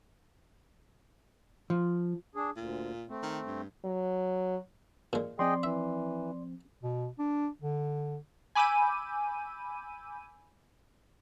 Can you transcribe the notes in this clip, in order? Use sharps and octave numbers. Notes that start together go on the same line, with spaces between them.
F3
D4 G#4
D2 A#2
A3 C4
D#3
G2
F#3
A#2 G#3
F3 C4 G#4 D5 D#5 G5 C6
E3 E5
B2
D4
D3
G#5 B5 D6 E6 G6 D#7